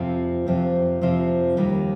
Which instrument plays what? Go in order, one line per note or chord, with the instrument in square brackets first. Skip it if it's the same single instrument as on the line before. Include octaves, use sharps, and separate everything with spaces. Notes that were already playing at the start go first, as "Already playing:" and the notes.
Already playing: [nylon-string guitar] F2 C3 F3 C4
F2 C3 F3 C4
F2 C3 F3 C4
D#2 D#3 G3